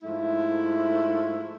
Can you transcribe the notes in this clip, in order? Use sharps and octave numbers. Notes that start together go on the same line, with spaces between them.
G#2 F3 A3 E4